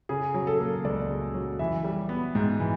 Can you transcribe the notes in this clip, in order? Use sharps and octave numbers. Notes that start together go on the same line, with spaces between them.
C#3 G#4
F#3
A4
A#3
C#2 D5
C#3
F#3
E3 E5
G3
B3
G#2
E3